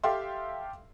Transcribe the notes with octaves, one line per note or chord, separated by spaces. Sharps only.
G4 A4 E5 F5 G5 C6